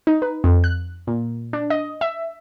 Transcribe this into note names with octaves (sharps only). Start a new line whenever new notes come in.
D#4
B4
F2
F#6
A#2
D4
D#5
E5